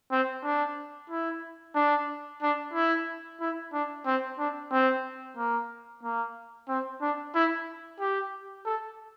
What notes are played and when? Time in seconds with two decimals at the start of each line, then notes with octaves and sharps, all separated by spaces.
0.11 C4
0.44 D4
1.10 E4
1.75 D4
2.42 D4
2.74 E4
3.41 E4
3.73 D4
4.06 C4
4.38 D4
4.72 C4
5.37 A#3
6.03 A#3
6.68 C4
7.01 D4
7.35 E4
8.00 G4
8.65 A4